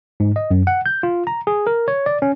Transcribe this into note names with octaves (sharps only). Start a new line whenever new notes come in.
G#2
D#5
F#2
F#5
G6
F4
A#5
G#4
A#4
C#5
D5
C#4